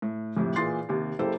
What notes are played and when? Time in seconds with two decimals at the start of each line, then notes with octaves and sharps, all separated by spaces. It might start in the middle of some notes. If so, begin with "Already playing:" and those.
0.02 A2
0.37 F2 A2 C3
0.56 A#2 E3 G#4 C6 A6 C7
0.89 D#2 C3
1.19 F#1 A#3 E4 G4 A4 C5